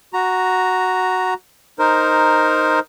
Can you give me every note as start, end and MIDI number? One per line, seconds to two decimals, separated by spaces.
0.13 1.34 66
0.13 1.34 82
1.79 2.79 63
1.79 2.79 70
1.79 2.79 72